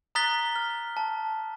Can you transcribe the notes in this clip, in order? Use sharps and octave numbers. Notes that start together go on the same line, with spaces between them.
A#5 D#6 F#6 A6 B6 G7
F6
A5